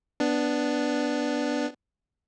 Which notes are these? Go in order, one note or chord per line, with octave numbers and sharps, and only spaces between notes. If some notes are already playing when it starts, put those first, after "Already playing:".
B3 D4